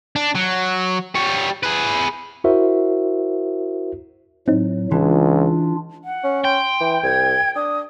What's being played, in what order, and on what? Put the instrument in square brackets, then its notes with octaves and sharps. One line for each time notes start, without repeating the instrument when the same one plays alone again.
[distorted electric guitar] D4
F#3
G3 C#5
G#4 B4
[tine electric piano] E4 F#4 A#4 C5 E5
[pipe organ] A2 F#3 [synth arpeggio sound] C4 D#4
[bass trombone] C#2 [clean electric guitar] E3 [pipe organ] D4 F4
[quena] F#5
[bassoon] C#4
[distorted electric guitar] G5 [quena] C6
[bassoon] E3
[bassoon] C2 [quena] G#6
[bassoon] D4 [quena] D#6